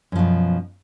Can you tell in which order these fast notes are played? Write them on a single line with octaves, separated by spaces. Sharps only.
F#2 F3 B2